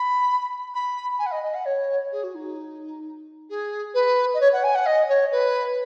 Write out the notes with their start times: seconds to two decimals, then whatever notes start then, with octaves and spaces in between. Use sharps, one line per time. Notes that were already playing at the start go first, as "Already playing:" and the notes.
Already playing: B5
0.74 B5
1.19 G#5
1.26 F#5
1.31 D#5
1.43 D#5
1.54 F#5
1.65 C#5
2.11 G#4
2.23 F#4
2.34 D#4
3.49 G#4
3.94 B4
4.33 D#5
4.40 C#5
4.52 F#5
4.63 G#5
4.74 F#5
4.86 D#5
5.09 C#5
5.31 B4